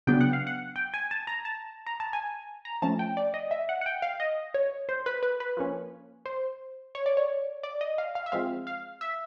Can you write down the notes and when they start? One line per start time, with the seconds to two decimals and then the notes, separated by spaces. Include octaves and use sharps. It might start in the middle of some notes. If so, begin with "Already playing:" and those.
0.07 C#3 F#3 B3 D4 G5
0.21 F#5
0.33 F5
0.47 F#5
0.76 G5
0.94 G#5
1.11 A5
1.27 A#5
1.45 A5
1.87 A#5
2.00 A5
2.13 G#5
2.65 A#5
2.82 F3 A3 C#4 A5
2.99 G5
3.17 D5
3.34 D#5
3.51 E5
3.69 F#5
3.81 F#5
3.86 G5
4.02 F5
4.20 D#5
4.54 C#5
4.89 C5
5.06 B4
5.23 B4
5.40 B4
5.57 F3 A#3 C#4
6.26 C5
6.95 C#5
7.06 D5
7.17 C#5
7.63 D5
7.81 D#5
7.98 F5
8.15 F5
8.26 E5
8.32 F3 G#3 C4 F5
8.67 F5
9.01 E5